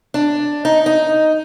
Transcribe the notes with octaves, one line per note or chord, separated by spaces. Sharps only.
D4
D#4
D#4